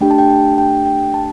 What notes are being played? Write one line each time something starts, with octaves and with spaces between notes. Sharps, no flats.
A3 D4 G4 G5
A5
G5
A5
G5
G5
A5